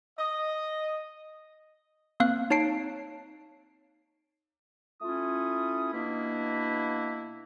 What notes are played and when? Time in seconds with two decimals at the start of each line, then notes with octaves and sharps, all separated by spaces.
0.18 D#5
2.20 A#3 C4 F5 F#6
2.50 D#4 C#5 A5 C7 D7
5.02 A3 C#4 E4 F4 D#6
5.94 B2 A#3 D4 E4